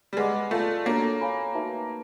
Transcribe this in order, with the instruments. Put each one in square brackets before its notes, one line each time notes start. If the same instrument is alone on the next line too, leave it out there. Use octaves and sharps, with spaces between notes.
[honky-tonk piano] G3
[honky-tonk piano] G#3 [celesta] B4 D#5 F#5 B5 D6
[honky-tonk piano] A3 [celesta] F4 A4 D5 F5 A5
[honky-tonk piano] A#3 [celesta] D4 F#4 A4 C#5
[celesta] C#5 F5 G#5 B5
D#4 F#4 B4 E5 A5